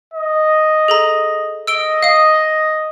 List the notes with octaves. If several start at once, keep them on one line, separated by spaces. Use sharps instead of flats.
D#5
G#4 A4 A#5
D#5 E6 D7 G7
F5 D#6